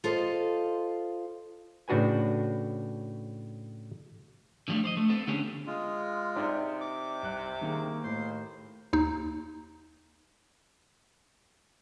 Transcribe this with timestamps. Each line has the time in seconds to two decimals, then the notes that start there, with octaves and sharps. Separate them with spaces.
0.04 F4 A4 C5 D#5
1.88 A2 C#3 D4 F#4 B4 G#5
4.68 D3 F3 G3 A3 D4
4.84 C5 D5 D#5
4.97 A3
5.09 B3 C4 A4
5.27 D3 B3 C#4 D4 G4 G#4
5.67 G#3 F4
6.36 C3 D#4 D5
6.81 D6
7.23 C2 F#6
7.61 D#3 A#3 G#4
8.04 D#2 A2 C5 C6
8.93 D#2 D#4